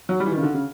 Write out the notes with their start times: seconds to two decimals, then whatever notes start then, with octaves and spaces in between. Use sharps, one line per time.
0.09 F#3
0.20 G3
0.26 E3
0.32 D#3
0.37 C#3
0.43 D3
0.54 C#3